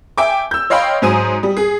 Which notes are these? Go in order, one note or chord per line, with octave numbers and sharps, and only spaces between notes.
E5 G5 G#5 D6
E6 G6
C#5 D#5 F5 G5 B5 C6
G#2 F#3 C5 G#5 D#6 D#7
G3
G#4